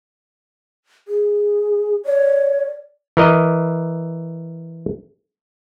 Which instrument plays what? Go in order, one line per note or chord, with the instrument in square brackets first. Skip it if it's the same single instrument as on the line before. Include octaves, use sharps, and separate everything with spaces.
[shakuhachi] G#4
[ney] C#5 [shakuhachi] D5
[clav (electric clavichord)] E3 A#4 D#5